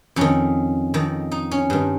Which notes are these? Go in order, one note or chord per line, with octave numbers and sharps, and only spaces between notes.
F2 D#3 C#4
F2 D#3
D#4
C#4
G2 D#3